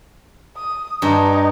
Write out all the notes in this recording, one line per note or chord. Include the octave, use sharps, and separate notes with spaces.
D#6
G2 D#4